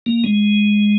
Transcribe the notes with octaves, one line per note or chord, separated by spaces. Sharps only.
A#3
G#3